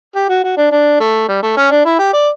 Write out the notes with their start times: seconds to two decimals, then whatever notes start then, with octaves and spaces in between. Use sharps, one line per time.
0.15 G4
0.29 F#4
0.44 F#4
0.57 D4
0.72 D4
1.00 A3
1.28 G3
1.43 A3
1.57 C#4
1.71 D4
1.86 E4
1.99 G4
2.13 D5